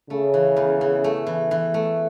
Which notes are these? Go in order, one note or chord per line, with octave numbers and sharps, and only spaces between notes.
C#3 A3
E3
E2
E3
A3
E3
E3
A3